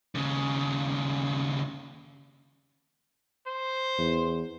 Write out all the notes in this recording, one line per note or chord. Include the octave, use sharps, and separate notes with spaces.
D#2 C#3
C5
E2